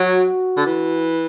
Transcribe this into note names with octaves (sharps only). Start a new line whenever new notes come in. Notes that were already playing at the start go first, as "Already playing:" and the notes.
Already playing: F#3 F#4
D3
E3